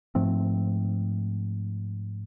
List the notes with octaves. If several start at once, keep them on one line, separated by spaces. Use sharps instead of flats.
G#2 F3 A3 C4